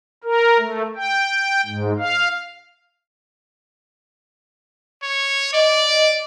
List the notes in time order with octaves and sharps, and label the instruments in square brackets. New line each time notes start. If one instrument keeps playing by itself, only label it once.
[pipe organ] A#4
A3
G5
G#2
F5
[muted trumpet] C#5
[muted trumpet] D5 [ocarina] D#5